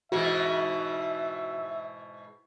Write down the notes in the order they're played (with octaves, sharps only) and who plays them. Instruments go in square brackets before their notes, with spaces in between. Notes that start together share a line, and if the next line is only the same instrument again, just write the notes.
[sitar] G#2 B2 E3 [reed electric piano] F#4 [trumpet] E5